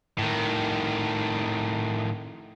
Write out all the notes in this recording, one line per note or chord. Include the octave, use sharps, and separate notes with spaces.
A2 D#3